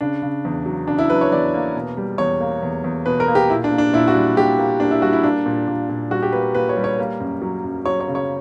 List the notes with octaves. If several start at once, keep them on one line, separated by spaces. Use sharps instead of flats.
C#3 D4
C#3
E2
F#3
C#3 D4
E4
F#3 B4
C#5
E2 D5
A#3
B2
G3
E2 C#5
A#3
E2
E2
B2 B4
A#4
A#3
G4
A#2 E4
D4
A#3
D4
A#2 E4
F#4
G3
A#2 G4
A#3
A#3 D4
E4
G3 F#4
E4
A#3 D4
A#2
A#2
A#2
G3 F#4
G4
A#3 B4
A#2 B4
C#5
G3
C#5
A#3
F#2
F#3
F#2
F#3 C#5
C#5
C#3
C#5